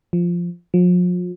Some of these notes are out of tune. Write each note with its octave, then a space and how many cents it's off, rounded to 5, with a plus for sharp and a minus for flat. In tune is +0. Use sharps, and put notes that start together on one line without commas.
F3 -5
F3 +40